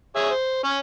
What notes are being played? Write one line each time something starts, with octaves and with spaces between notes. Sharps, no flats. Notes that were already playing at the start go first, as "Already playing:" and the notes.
G#4 C#5 E5
C5
C#4 C#5